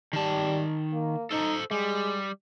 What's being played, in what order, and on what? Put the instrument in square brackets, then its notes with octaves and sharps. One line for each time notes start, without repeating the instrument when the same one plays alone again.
[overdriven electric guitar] D#3 A5 [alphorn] G3
[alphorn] A#3
[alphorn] D#4 [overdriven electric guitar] A4 C5
[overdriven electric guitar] G3 [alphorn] G#3